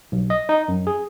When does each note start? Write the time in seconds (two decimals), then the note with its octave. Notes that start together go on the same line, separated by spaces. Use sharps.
0.12 B1
0.30 D#5
0.49 D#4
0.68 F#2
0.87 G#4